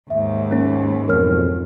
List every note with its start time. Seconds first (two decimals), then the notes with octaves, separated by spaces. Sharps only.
0.10 D#2 G#2 E5
0.51 A#3 C#4
1.08 B1 F2 A#4 C#5 F6